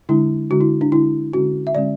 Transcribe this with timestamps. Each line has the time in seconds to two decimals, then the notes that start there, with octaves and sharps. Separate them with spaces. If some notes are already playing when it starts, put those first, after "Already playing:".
0.09 D3 G#3 D4 E4
0.50 D3 G#3 D4 F#4
0.61 E4
0.81 D4
0.92 D3 G#3 D4 E4
1.33 D3 G#3 C#4 F#4
1.67 E5
1.75 D3 G#3 C#4 D5